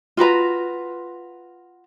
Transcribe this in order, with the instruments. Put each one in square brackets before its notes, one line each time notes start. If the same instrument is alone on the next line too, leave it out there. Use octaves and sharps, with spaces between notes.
[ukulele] F4 F#4 B4 A#5